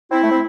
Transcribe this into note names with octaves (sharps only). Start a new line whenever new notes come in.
C4 E4
A3
C4